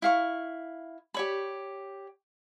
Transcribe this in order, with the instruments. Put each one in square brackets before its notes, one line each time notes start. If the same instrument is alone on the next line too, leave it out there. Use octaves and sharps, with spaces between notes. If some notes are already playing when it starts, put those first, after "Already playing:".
[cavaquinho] E4 F5 C#6
G4 C#5 B5